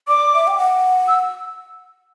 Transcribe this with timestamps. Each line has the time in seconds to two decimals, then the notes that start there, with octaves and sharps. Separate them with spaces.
0.08 D5 D6
0.34 E5
0.47 G5
0.58 F#5
1.08 E6